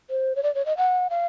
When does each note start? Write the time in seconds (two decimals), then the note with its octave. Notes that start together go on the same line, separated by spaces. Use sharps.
0.10 C5
0.36 C#5
0.43 D5
0.55 C#5
0.66 D#5
0.77 F#5
1.10 F5